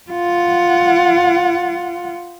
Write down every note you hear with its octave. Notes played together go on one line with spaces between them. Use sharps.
F4 F#5